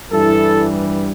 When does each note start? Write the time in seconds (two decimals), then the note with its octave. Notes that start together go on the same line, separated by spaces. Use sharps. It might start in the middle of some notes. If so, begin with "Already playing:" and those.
0.11 G2 E3 G3 E4 A4